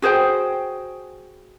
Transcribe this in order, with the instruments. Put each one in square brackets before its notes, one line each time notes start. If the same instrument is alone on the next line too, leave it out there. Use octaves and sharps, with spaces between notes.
[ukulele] F#4 G#4 C5 G5